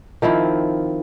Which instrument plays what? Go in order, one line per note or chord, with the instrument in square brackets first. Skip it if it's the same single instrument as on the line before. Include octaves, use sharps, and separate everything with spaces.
[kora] D#3 F3 C4 E4